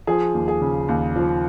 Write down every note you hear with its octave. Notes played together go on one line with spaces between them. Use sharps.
F3 G#4
D#2
G#4
C#3
D#2
F3